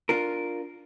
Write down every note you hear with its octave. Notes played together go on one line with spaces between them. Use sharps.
D4 F4 A#4